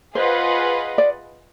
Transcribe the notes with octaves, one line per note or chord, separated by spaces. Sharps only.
F4 G#4 B4 C5 D#5 F#5
D5